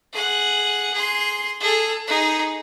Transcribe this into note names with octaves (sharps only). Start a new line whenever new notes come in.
G#4 F#5
G#4 C6
G#4 A4
D#4 G#4